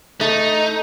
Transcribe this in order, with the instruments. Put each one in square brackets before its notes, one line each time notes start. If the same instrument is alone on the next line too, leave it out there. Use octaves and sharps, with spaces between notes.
[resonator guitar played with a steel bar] A3 [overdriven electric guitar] D#4